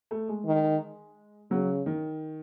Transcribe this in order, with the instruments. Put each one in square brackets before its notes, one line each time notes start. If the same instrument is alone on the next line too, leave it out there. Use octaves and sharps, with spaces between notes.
[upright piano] A3
G#3
[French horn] D#3
[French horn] C#3 [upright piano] F#3
[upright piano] D#3